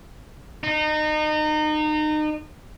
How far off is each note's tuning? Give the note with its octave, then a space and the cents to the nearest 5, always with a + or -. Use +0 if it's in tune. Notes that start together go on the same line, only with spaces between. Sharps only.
D#4 -30